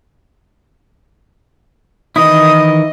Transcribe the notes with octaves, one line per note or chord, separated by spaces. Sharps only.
D#3 E3 E4 D#5 D#6